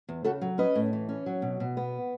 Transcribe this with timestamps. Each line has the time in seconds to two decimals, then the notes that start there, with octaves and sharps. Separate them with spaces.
0.09 E2
0.24 C#3 F#4 A4
0.41 F#3
0.58 C#4 B4 D#5
0.75 A2
0.93 E3
1.09 C#4
1.26 F#3
1.42 B2
1.60 B2
1.77 B3